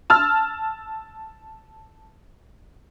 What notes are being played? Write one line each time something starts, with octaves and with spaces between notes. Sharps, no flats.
A5 E6 F6